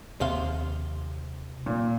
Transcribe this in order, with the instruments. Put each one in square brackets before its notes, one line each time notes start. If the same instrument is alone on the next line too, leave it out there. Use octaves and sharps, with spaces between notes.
[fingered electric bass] D#2 A#3 [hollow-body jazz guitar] C3 F5 C6
[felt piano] A#2